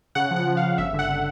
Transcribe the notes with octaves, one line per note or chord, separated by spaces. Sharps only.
C#3 F#5
F3
F#5
F3
F5
C#3
G1 E5
D3 F#5